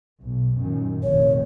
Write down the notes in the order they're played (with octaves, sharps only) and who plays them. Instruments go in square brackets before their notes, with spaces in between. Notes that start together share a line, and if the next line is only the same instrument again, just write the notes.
[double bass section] B1
F#2 A#2 D#3
[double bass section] F1 A#1 D#3 [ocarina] C#5